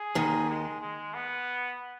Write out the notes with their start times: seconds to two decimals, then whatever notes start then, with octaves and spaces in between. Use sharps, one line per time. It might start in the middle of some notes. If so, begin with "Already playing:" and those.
Already playing: G#4
0.15 D#2 D#3
0.49 G#3
0.80 G#3
1.14 B3